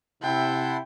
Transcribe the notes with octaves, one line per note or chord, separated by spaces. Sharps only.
C3 E4 F#5 G5 A5 C6